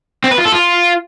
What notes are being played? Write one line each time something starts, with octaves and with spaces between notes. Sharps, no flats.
C4
B4
F4
A4
F4